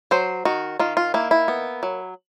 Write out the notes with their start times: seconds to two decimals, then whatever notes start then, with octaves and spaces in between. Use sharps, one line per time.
0.11 F#3 C5
0.45 D#3 F#4
0.79 D#3 F4
0.97 F4
1.14 A#3 E4
1.31 E4
1.48 B3
1.83 F#3